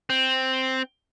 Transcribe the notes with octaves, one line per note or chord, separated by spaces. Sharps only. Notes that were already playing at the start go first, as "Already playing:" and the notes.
C4